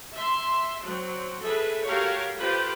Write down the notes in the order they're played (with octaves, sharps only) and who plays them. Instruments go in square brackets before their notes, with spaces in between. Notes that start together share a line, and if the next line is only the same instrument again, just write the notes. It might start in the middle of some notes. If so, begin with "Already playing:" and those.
[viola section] E5 C6
F#3 C4
G#4 A4 B4 E5
F#4 G4 A4 A#4 C#5 F5
F4 G4 B4 C5